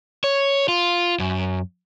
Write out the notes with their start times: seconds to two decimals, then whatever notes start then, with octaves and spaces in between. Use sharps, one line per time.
0.24 C#5
0.68 F4
1.20 F#2